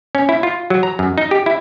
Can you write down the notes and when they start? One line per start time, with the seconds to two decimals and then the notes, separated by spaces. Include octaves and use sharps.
0.15 C#4
0.29 E4
0.43 F4
0.70 F#3
0.83 A#5
0.99 F#2
1.18 D#4
1.31 G4
1.46 E4